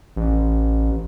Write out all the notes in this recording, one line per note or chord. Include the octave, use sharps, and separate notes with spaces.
A1